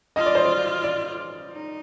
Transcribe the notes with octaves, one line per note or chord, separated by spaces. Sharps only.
F4 D#5
D5
C5
D5
D5
D#4